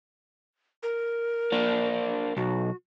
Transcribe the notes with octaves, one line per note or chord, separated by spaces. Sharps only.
A#4
A#3 D4
B1 F#4